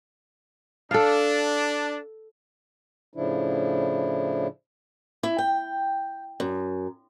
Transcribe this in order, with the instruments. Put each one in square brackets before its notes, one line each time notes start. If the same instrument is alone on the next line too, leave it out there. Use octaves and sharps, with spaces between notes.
[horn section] D4 [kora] A4 F5
[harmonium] A2 C#3 F3 D4 E4
[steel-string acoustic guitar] E4
G5
F#2